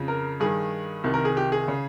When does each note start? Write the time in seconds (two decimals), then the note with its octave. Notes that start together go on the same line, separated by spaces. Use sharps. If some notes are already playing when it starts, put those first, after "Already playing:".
Already playing: F2 C#3
0.08 A#4
0.40 G2 D#3 G#4
1.04 C2 C3 D#3
1.14 A#4
1.25 G#4
1.37 G4
1.52 G#4
1.68 C#3